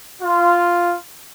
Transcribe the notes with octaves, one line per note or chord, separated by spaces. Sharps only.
F4